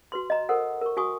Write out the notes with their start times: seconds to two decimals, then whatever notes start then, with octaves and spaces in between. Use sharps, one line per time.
0.12 F#4 B4 C6
0.30 D#5 A#5
0.49 A4 A#4 C5 F#5
0.81 A#4 C#6
0.97 F#4 G#5 C#6 D#6